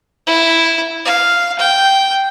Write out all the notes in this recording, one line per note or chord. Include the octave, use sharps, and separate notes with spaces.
E4
F5
G5